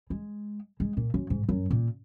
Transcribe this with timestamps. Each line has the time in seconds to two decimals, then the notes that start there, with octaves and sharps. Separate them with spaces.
0.10 G#3
0.80 G#3
0.97 A#2
1.14 F#2
1.30 G#2
1.49 F#2
1.71 A#2